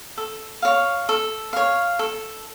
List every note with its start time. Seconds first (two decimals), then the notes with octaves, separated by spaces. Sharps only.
0.17 A4
0.62 C#5 F5
1.09 A4
1.53 C#5 F5
1.99 A4